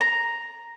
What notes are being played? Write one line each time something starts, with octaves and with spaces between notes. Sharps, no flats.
A#5